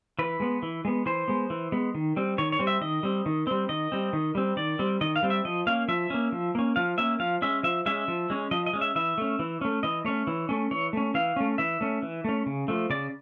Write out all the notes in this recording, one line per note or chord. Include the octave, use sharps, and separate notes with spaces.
E3 B4
G#3 B3
E3
G#3 B3
E3 C5
G#3 B3
E3
G#3 B3
D#3
G3 C4
D#3 C#5
C#5
G3 C4
E5
D#3 D#5
G3 C4
D#3
G3 C4
D#3 D#5
G3 C4
D#3
G3 C4
D#3 D5
G3 C4
D#3 D#5
F5
G3 C4
E5
F3 D#5
A#3 C#4 F5
F3 E5
A#3 C#4
F3
A#3 C#4
F3 F5
A#3 C#4 E5
F3 F5
G#3 C#4 E5
F3 E5
G#3 C#4 E5
F3
G#3 C#4
F3 D#5
D#5
G#3 C#4
E5
E3 E5
A3 C#4
E3
A3 C#4
E3 D#5
A3 C#4 C#5
E3
A3 C#4
E3 C#5
A3 C#4
E3 F5
A3 C#4
E3 E5
A3 C#4
E3
A3 C#4
C#3
F3 A3
C#3 D5